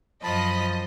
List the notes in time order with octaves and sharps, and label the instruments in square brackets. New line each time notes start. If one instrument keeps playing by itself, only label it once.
[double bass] F#2 [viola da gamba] F3 [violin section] D#5 [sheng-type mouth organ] A5 B5